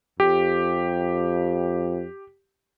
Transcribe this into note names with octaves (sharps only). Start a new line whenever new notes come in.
F2 G4